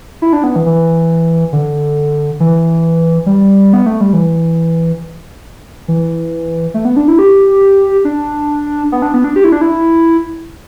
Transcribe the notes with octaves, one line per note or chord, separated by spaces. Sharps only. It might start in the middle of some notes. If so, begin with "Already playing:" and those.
E4
D4
B3
E3
E3
D3
E3
G3
B3
A3
G3
E3
E3
A3
B3
D4
E4
G4
D4
B3
D4
B3
D4
G4
E4
D4
E4